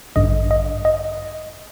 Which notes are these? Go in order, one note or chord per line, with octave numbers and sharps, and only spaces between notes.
A1 G2 D3 D#5
D#5
D#5